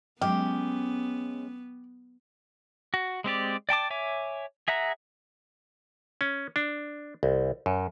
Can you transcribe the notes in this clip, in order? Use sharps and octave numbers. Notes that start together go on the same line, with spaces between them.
F#3 G#3 B3 C#4 G4
F#4
G#3 C4 G4 D5
D5 G5 A5 D6
C#5 E5 G#5 D6
G#4 E5 F#5 A#5
C#4
D4
C2
F#2